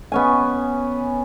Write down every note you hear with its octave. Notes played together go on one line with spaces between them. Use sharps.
B3 C#4 G#5